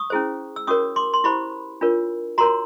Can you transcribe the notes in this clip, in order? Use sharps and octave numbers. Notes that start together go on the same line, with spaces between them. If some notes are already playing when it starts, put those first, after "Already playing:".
Already playing: C#6 D#6
C#4 E4 G#4 C5
E6
C#4 F#4 A#4 C#5 C#6 D#6
C6 D6
C6
E4 G4 C5 B5 C#6
D4 F4 A#4 C#5
F#4 A#4 C#5 A#5 C6